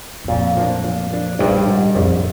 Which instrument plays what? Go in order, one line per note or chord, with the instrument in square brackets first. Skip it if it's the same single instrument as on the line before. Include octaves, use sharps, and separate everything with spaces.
[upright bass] G2
[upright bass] F2 [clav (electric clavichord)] A#2
[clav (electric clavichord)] F3 A#3 D4
A#2
F3 A#3 D4
[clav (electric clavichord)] A#1 [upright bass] G2
[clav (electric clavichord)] G#2 G3
[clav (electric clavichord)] A#1 [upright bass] F2